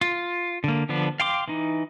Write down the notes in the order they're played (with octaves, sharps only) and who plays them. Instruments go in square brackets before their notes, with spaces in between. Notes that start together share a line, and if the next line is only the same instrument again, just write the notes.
[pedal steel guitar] F4
D3 A#3
D3 F3 B3 D4
F5 G5 C6 D6
E3 D#4